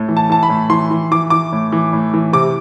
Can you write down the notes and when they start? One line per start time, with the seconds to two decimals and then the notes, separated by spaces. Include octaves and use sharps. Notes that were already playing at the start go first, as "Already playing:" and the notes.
Already playing: A2
0.09 E3
0.17 A5
0.30 E3 A5
0.43 B5
0.50 A2
0.70 E3 C6
0.91 E3
1.11 E3 D6
1.30 E3 D6
1.52 A2
1.72 E3
1.93 A2
2.14 E3
2.33 C3 D6